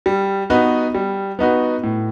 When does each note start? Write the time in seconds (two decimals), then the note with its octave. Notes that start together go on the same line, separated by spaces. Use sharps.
0.06 G3
0.50 B3 D#4 F#4 B4
0.95 G3
1.39 B3 D#4 F#4 B4
1.83 A2